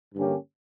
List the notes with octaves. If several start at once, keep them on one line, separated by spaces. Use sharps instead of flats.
G2 D3 A#3 C#4 G4